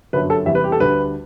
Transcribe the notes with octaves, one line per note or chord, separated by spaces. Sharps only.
G1 F#2 D3 F#3 B4
A4
E2 C3 G3 E5
B4
G4
A4
D2 D3 G3 B4